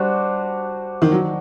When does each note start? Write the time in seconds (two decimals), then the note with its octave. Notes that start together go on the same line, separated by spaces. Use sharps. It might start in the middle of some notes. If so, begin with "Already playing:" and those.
Already playing: G3 D4 F#4 C5
1.02 D#3
1.12 F#3